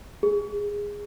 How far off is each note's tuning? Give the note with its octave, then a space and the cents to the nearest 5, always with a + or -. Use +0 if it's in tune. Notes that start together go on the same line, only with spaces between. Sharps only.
G#4 -15